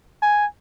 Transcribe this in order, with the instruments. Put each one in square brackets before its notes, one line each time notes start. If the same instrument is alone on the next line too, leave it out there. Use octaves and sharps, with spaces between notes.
[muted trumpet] G#5